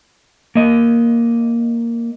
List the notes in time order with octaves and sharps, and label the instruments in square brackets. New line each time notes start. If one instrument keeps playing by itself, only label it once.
[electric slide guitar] A#3 D#5